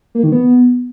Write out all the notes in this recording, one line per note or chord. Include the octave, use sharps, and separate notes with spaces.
A#3
D#3
B3